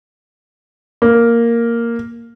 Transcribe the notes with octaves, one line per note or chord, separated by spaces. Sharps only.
A#3